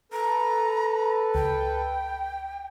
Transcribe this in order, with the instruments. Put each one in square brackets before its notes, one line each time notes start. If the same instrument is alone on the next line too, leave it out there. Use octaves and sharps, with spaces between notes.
[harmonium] A4 B4 [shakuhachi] A#5
[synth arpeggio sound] C#2 [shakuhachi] G5